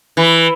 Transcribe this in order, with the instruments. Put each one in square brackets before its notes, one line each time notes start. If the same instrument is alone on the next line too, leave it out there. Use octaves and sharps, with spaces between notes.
[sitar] E3